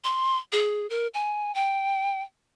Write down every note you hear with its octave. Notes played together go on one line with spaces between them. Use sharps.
C6
G#4
A#4
G#5
G5